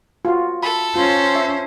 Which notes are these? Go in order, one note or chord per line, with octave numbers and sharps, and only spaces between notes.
F4 F#4
A4 B5
C#4 F4 C5
E5